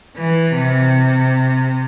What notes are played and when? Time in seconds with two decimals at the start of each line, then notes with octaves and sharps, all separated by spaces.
0.17 E3
0.54 C3